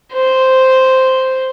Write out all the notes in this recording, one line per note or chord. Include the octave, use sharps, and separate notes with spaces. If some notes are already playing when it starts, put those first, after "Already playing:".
C5